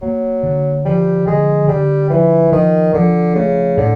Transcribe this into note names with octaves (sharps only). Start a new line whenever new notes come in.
F#3 A#3
D3
F3 G3
D3 G#3
D3 G3
E3 F3
D#3 F3
D3 F3
C#3 A3
A2 D3